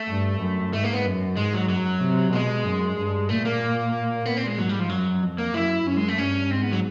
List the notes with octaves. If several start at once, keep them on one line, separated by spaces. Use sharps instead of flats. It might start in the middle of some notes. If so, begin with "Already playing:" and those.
Already playing: A3
G2
F#2
G#2 A3
A#3
B3
F#2
G#2 G#3
F#3
F#2 F#3
C3
B2 G#3
F#2
G2
A#2 A3
A#3
A#2 B3
C4
G#3
G#2 F#3
G3
F3
F#2 F#3
F2
A#3
F#2 E4
F#2 C#4
G#3
A3
G2 C#4
G#2 C4
B3
F#3